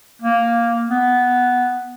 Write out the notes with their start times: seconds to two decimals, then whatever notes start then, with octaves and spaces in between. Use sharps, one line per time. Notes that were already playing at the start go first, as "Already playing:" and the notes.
0.22 A#3
0.90 B3